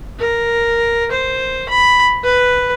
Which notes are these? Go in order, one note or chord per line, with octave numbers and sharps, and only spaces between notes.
A#4
C5
B5
B4